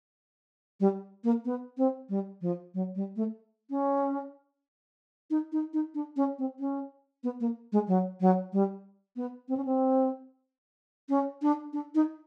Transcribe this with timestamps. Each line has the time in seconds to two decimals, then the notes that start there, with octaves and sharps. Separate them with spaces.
0.80 G3
1.24 A#3
1.45 B3
1.78 C4
2.09 G3
2.41 F3
2.74 F#3
2.95 G3
3.16 A3
3.70 C#4
5.30 D#4
5.52 D#4
5.73 D#4
5.95 D4
6.16 C#4
6.39 C4
6.60 C#4
7.24 B3
7.40 A#3
7.72 G#3
7.88 F#3
8.21 F#3
8.53 G3
9.16 B3
9.48 C4
9.57 C#4
9.65 C4
11.09 C#4
11.42 D4
11.73 D4
11.95 D#4